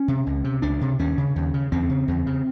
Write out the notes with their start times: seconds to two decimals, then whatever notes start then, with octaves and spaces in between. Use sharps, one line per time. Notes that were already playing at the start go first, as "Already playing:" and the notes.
Already playing: C#4
0.08 C3
0.26 C#2
0.44 C3
0.62 C#2 D4
0.81 C3
0.99 D#2 C#4
1.18 C#3
1.36 D#2
1.54 C#3
1.72 E2 C4
1.89 C#3
2.08 E2
2.27 C#3